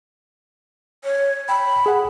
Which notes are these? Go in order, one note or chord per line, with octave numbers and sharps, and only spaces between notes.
C#5
G5 B5
G#4 F#5